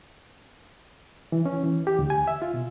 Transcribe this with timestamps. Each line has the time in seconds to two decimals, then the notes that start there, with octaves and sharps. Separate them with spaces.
1.32 E3
1.46 C#4
1.63 E3
1.87 G4
1.99 D2
2.10 G#5
2.27 E5
2.42 F4
2.54 B2